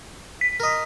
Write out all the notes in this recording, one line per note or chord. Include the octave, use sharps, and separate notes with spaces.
B6
A#4 D#5